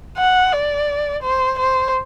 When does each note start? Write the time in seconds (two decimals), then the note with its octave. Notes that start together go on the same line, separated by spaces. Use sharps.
0.18 F#5
0.53 D5
1.23 C5
1.59 C5